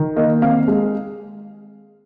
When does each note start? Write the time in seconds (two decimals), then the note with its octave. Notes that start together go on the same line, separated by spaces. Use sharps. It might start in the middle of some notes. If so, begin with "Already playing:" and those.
Already playing: D#3
0.16 A#3 D#5
0.42 C4 F5
0.68 G#3